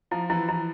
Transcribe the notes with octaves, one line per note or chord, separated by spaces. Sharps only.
F3 E4
E3 E4
E3 E4